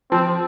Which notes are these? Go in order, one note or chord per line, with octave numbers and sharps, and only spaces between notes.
F3 C4